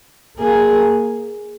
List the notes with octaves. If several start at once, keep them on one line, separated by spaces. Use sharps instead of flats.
A#3 G#4